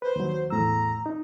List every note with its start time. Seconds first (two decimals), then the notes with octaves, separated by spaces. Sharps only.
0.02 B4 C5
0.16 D#2 F#3
0.50 E2 A2 A#5 E6
1.06 D#4